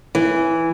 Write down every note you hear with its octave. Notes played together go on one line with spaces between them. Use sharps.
E3